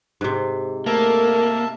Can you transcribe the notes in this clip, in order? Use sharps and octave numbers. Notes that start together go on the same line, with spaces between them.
G#2 C3
A3 A#3 A#4 E5 A5